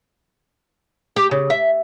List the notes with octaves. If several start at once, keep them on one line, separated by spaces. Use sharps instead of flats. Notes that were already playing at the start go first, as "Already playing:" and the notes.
G4
C#3
E5